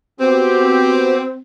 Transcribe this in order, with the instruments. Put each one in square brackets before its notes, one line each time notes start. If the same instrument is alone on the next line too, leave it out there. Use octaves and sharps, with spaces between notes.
[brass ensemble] B3 F#4 G4 [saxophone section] C4